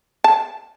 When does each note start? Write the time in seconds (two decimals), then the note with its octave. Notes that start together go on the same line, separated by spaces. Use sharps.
0.24 A5